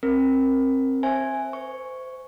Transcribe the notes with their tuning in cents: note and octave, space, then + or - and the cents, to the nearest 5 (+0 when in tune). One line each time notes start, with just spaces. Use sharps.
C4 +20 A#4 +0
C5 +30 E5 +0 G#5 +0
C5 -25 C#6 +0